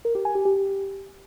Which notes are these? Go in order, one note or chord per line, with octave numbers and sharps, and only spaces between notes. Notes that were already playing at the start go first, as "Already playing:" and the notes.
A#4
G4
G#5
G4
G4